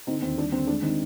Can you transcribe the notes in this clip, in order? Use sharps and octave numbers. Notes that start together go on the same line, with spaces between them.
D3 C4 D#4
D#2 C4
G3 D4
D3 C4
G#3 D4
D#3 C4 D#4